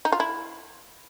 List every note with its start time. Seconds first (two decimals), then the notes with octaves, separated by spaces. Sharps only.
0.05 D#4
0.12 F4
0.20 E4